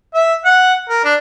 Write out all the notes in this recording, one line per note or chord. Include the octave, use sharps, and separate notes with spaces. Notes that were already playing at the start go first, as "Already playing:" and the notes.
E5
F#5
A#4
D4